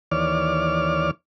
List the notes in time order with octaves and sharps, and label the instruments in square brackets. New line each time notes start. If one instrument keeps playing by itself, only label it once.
[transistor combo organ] D#2 E3 C#5 D5 D6 F6